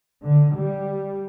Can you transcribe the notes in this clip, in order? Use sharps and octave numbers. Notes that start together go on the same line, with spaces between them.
D3
G3